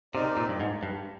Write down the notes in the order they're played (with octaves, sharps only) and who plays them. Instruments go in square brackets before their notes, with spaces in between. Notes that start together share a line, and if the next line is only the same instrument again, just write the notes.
[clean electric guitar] C3 [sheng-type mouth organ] C4 D#4 A#4 D5
[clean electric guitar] A#2
G2
G#2
G2